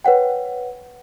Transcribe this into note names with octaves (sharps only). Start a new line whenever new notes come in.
B4 C#5 F#5 G5